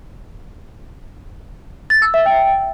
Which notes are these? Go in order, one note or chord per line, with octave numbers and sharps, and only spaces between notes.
A6
E6
E5
G5